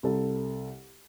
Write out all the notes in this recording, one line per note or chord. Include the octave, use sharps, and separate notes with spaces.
C2 A4